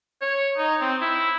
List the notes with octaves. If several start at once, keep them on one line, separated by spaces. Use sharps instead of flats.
C#5
D#4
C4
E4